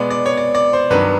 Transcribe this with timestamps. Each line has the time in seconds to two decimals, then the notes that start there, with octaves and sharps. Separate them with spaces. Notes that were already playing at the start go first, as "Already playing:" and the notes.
Already playing: B2 G#3 B3 D5
0.10 D5
0.26 C#5
0.37 D5
0.55 D5
0.73 C5
0.90 G2 D#3 F#3 B3 D4 B4